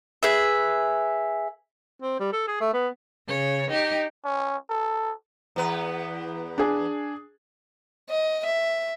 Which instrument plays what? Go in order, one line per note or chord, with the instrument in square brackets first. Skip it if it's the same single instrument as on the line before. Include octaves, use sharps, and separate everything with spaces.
[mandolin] G#4 B4 E5
[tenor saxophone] C4
G3
A4
G#4
A3
B3
[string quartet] C#3 C#5
D#4 G4
[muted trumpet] C#4
A4
[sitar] E2 B3
[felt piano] D4 G#4
[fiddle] D#5
E5